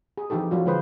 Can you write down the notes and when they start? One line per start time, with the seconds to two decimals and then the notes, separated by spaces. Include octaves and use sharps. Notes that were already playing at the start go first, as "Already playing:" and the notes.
0.18 G#4
0.30 E3 F3 D#4 G4 A4
0.51 F3 F#3 F4 F#4
0.66 D3 F3 G#3 F4 B4 C5